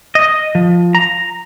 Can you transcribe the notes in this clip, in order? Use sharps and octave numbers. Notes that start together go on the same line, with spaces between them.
D#5
F3
A#5